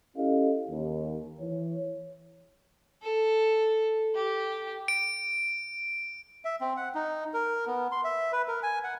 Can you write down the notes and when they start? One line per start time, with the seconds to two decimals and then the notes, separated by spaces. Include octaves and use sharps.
0.17 C#4 E4 G4 A4 D#5 F5
0.69 D#2
1.40 E3 C#5
3.02 A4
4.15 G4
4.88 D7
6.45 E5
6.61 C4
6.77 F#5
6.95 D#4
7.34 A#4
7.67 B3
7.92 C6
8.04 E5
8.32 B4
8.48 A#4
8.63 G#5
8.84 F#5